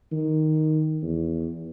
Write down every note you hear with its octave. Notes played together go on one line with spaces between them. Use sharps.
D#3
E2